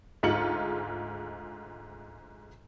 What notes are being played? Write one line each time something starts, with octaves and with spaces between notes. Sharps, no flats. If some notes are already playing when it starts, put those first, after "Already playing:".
D2 G#2 G#3 F4 C#7 F#7